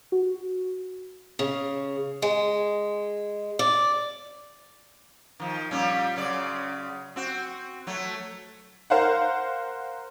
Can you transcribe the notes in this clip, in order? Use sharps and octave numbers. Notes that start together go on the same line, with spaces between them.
F#4
C#3
G#3
D5
D#3 F3
A#2 G3 C#4
F#2 C#3 D5
C4 F#4
F#3 A3
A#4 C5 F5 F#5